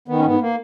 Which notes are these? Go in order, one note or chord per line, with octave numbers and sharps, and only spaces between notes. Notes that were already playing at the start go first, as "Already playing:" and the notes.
D#3 B3
C#4
G#2 B3
A#3